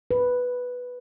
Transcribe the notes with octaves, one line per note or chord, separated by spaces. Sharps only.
B4